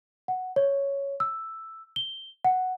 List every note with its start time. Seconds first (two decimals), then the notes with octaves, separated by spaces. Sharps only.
0.28 F#5
0.56 C#5
1.20 E6
1.96 G7
2.44 F#5